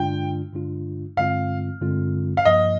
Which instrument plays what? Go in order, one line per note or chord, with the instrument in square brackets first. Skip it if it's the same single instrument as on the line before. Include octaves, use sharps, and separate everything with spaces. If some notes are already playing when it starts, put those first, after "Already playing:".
Already playing: [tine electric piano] G2 D3 G#3 D4 F4 [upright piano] G5
[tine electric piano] G2 D3 G#3 D4 F4
[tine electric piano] G2 D3 G#3 C4 F4 [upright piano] F5
[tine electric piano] G2 D3 G#3 C4 F4
[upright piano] F5
[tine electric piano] G2 F3 A#3 [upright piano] D#5